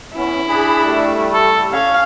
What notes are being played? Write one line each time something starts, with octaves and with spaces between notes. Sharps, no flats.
B3 C#4 E4
D4 G#4 B5
G3 A3
A4
C#4 F5